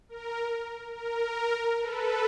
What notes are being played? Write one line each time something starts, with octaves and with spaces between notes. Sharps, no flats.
A#4
A#4
A4 B4